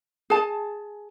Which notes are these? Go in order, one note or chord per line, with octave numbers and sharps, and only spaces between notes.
G#4 A5